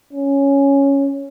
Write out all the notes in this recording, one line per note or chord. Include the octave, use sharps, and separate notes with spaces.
C#4